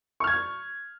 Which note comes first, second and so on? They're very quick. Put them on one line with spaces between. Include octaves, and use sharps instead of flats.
C#6 F6 G#6